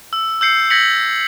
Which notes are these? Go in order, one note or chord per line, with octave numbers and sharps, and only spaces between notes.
E6
E6 G6 C7 C#7
G6 G#6 A#6 B6 C#7 F#7